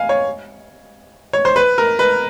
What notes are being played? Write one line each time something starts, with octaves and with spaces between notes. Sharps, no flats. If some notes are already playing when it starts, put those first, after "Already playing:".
Already playing: F5 G#5
C#5
C#5
C5
B4
A#4
B4